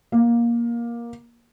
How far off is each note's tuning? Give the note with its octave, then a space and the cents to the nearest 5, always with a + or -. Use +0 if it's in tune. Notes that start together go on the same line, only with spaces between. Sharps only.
A#3 +15